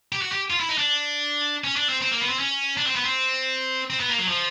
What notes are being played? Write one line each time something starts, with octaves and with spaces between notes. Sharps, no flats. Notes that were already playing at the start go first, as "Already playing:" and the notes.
G4
F#4
G4
F4
E4
D#4
D4
C#4
D4
C4
C4
A#3
B3
C4
C#4
D4
C4
B3
C4
C4
B3
A#3
F#3
F3